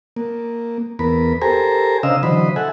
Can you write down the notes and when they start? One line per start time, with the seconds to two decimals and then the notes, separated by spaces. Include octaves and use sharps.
0.16 A#3
0.99 E2 B3 A#4 B5
1.42 G4 A4 A#4 C5 G#5 A#5
2.03 C#3 D4 C5 D#5 F5 E6
2.23 D3 E3 F#3 C5 D#5 B5
2.56 A4 E5 F#5 G#5